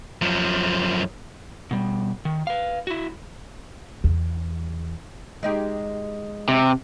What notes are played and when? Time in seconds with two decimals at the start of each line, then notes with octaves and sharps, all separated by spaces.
0.22 F#2 F3
1.71 B2 G3
2.25 D#3
2.47 B4 F5
2.87 E4 F#4
4.04 E2
5.43 G#3 D#4 G4
6.48 C3